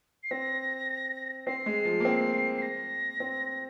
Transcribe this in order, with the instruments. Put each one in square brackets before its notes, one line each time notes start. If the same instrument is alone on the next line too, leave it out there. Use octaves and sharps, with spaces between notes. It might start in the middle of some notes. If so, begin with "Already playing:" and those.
[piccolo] C7
[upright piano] C4 [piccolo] A#6
[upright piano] C4 [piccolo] C7
[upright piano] G#3
F3
A#3
C4
[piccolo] C7
A#6
[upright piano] C4